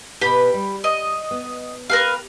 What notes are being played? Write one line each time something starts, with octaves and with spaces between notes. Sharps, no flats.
B2 B3 G4 B4 B5
G3
D#5
B3
G4 A#4 B4 F5